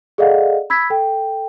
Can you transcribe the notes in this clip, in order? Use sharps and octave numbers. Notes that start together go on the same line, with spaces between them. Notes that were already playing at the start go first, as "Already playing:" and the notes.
G#4 A4 D5 D#5 F5 F#5
B5 E6 G#6 B6
A4 G5